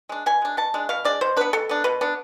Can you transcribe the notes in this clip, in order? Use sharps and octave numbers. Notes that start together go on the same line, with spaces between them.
G#3 D4
B2 G#5
G#3 D4
B2 A5
G#3 D4
B2 F5
G#3 D4 D5
B2 C5
B3 D4 B4
B2 A4
B3 D4
B2 B4
B3 D4